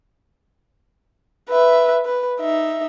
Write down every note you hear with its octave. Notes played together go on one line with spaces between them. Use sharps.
B4 E5
B4
D#4 E5